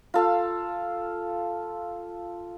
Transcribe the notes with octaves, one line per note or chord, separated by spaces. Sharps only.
F4 A4 F5